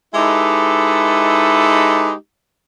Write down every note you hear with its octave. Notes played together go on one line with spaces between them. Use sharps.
G#3 D#4 E4 G4 A4 B4